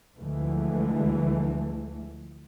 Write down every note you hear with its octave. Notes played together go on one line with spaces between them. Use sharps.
D2 D3 E3 F3 G#3 A3